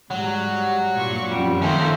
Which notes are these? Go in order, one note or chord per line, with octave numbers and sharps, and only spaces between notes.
G#2 F#3 G3
G2 A#2 C#6
F#2 F3 G3 C4 F4
D#3 A3 A#3 C#4 A4 C5